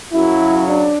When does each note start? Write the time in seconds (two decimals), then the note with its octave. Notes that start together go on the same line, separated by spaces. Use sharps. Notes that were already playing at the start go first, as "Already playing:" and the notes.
0.12 F#2 C#3 F#3 E4
0.68 D4